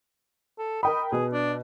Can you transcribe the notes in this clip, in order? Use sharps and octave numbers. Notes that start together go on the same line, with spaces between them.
A4
A#4 D#5 G5 B5
B2 B3 G#4
D4